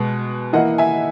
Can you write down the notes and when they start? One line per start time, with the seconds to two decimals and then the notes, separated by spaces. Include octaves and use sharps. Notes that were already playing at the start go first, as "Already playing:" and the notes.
Already playing: B2 G#3 B3
0.53 E3 A#3 E4 D#5 F#5
0.78 E5 G#5